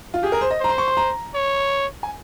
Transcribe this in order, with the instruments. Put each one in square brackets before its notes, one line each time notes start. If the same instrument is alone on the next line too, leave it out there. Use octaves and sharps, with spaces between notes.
[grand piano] F4
[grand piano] G4 [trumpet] G#4
[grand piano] A#4
C5
D#5
[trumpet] C5 [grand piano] A#5
[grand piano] C6
C#6
C6
A#5
[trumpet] C#5
[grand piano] G#5